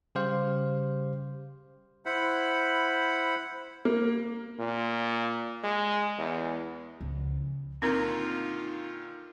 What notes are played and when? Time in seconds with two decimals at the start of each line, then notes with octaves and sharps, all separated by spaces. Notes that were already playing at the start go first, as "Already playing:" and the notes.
0.15 C#3 G3 G4 C5 F5
2.06 E4 C5 F#5 B5
3.85 A#3
4.59 A#2
5.64 G#3
6.18 E2
7.01 C#2 F3
7.82 A#2 D3 D#3 C4 D#4 F4 A#4 A#5